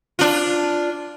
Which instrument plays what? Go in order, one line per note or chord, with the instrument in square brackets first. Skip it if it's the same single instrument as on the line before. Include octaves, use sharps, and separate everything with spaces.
[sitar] D4 F4